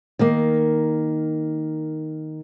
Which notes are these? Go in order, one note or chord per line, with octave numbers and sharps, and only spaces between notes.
D#3 A#3